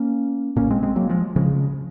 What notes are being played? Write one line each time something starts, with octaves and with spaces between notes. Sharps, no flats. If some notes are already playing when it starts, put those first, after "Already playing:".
Already playing: A#3 C#4
A#1 A#2 A#3 C#4
G#3 C4
G#3 C4
F#3 A#3
F3 G#3
C#3 F3 G#3